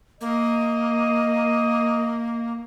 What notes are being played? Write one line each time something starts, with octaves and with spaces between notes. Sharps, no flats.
A#3 D#5